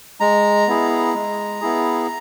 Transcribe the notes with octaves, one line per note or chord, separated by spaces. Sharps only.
G#3 A#5
B3 E4 G#4
G#3
B3 E4 G#4